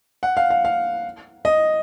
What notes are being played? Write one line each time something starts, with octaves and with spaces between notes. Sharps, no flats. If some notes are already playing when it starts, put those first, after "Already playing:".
F#5
F5
F5
F5
D#5